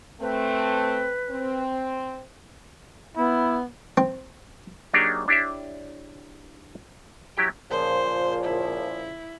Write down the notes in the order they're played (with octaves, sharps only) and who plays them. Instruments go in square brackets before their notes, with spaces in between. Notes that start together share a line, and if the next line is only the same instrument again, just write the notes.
[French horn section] A3 C4 [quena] B4
[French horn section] C4
[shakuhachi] B3 [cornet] E4
[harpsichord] C4
[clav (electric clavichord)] F#3 A#3 D4 D#4 G4 G#4
D4 E4 G4 C#5 D5 E5
F#3 E4 G4 G5
[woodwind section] A#2 C#3 F3 [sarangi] C5
[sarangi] E4